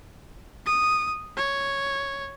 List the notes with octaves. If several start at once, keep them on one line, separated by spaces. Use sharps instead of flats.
D#6
C#5